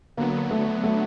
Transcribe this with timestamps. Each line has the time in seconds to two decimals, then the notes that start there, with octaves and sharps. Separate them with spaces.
0.17 D3 F#3 A#3 B3
0.51 A3
0.84 A3